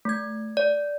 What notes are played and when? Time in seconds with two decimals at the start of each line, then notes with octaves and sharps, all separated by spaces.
0.05 A3 G#6
0.57 D5